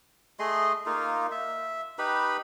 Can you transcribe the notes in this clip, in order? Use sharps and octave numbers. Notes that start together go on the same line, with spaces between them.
A3 G#4 D#5 C6
A#3 D#4 F4
E5
D#4 G4 B4 B5